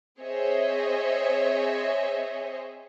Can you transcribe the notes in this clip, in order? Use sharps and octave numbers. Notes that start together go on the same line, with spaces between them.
C4 G#4 C5 C#5 D#5 E5